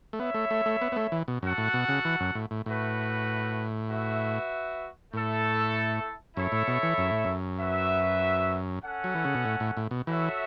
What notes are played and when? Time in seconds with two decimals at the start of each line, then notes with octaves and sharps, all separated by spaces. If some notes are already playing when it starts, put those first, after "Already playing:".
0.13 A3
0.19 B3 E4 C#5 E5
0.34 A3
0.51 A3
0.66 A3
0.81 B3
0.92 B3
0.96 A3
1.12 E3
1.28 B2
1.43 F#2 F#4 A4 F#5
1.58 A2
1.74 B2
1.89 C#3
2.05 E3
2.20 F#2
2.35 A2
2.51 A2
2.66 A2 A3 F#4 B4
3.90 F#4 B4 E5
5.13 A2 A3 E4 A4 E5
6.36 F#2 E4 A4 C#5 E5
6.52 A2
6.67 B2
6.83 E3
6.98 F#2
7.12 A2
7.25 F#2
7.59 F#4 B4 E5
8.84 C#4 A4 F#5
9.04 F#3
9.15 E3
9.25 C#3
9.35 B2
9.45 A2
9.60 A2
9.77 A2
9.91 B2
10.07 E3 F#4 A4 C#5 E5